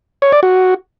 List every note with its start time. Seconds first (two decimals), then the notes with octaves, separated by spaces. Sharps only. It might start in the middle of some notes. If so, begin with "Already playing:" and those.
0.22 C#5
0.32 D5
0.43 F#4